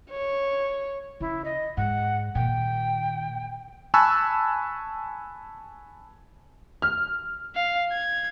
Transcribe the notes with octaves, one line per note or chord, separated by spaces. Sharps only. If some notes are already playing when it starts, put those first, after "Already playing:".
C#5
C#3 E4
D#5
G#2 F#5
A#2 D#3 G5
G#5 A5 B5 C#6 E6 F#6
F6
F5
G#6